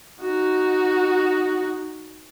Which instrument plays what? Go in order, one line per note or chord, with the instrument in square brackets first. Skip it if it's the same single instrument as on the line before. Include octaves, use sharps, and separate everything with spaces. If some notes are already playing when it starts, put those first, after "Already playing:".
[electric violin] D#4 F#4